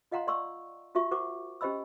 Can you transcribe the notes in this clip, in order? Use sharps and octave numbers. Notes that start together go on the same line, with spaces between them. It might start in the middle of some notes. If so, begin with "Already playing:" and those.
F4 D#5 F5 F#5 A#5 C6
D5 C6 C#6 E6
F4 F#4 E5 C#6
F#4 A#4 C5 F#5 C#6 D6
C#4 G4 C5 D#5 B5 E6